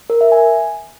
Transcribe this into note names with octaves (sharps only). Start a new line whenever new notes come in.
A#4
E5
G#5